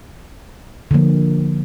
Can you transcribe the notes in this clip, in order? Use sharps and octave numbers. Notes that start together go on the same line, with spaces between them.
D3 F3 A#3